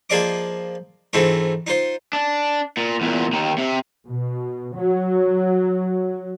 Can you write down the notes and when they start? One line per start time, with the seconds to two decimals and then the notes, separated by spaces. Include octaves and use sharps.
0.10 F3 A#3 G#4 D5 D#5 D6
1.13 G#2 E3 A3 C4 D#4 F4
1.67 D#4 F4 C5
2.13 D4
2.77 A#2
3.01 E2 A#2
3.33 D#2 D#3
3.58 C3
4.07 B2
4.76 F#3